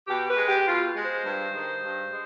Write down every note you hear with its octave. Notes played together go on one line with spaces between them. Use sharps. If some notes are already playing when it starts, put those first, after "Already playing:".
B2 G4
B4
G#3
G4
B2 F4
G#3
C5
G2
D#3 G#3
G2
G#3